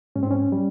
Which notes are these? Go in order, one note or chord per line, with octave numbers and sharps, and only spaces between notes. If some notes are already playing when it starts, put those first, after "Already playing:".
G#2 C#4
C4
C#4
G3